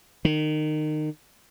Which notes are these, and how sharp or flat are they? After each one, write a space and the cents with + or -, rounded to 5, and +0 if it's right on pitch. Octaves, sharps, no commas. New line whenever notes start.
D#3 -25